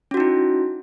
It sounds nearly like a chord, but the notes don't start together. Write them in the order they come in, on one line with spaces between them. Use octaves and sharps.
C#4 F#4 D#4 E4